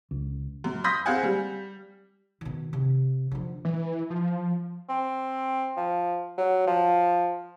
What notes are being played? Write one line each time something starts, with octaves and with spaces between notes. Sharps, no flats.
C#2
F#2
B5 C6 D#6 G6 A#6 B6
C4 G#4 F5 F#5 G#5
G3
B2 D#3
C3
D3 F3
E3
F3
C4
F3
F#3
F3